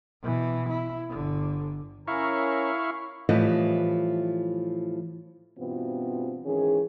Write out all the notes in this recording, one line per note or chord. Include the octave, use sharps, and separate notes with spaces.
B2 E3
E4
G1 D3
C#4 E4 A#4 F5 A#5 C#6
A2 E3 F3 G3 D#5
G2 B2 E3 B3 C4 F4
G#2 D#3 E3 C#4 G#4